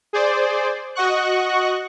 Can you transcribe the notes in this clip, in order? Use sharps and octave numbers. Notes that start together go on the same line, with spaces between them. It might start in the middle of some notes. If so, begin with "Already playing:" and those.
G#4 C5 D5
F#4 D#5 F#5 C#6 F#6